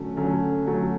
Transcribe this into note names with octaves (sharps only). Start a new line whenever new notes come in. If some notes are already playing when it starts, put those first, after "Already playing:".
Already playing: D3 F#3 A3 C#4
D3 F#3 A3 C#4
D3 F#3 A3 C#4